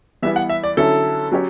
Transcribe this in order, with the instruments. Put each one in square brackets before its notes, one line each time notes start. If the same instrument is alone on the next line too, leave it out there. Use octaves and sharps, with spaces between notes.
[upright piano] E3 G3 B3 E4 [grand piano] E5
[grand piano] F#5
E5
D5
[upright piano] D3 F#3 C#4 E4 [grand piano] A4
[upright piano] F#3 C#4 G4 C#5